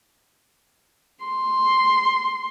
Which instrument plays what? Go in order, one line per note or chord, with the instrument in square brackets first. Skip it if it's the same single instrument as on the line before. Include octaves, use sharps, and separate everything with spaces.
[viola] C6